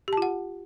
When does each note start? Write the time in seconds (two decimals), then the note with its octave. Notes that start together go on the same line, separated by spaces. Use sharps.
0.08 G4
0.13 A5
0.17 F4
0.22 F#5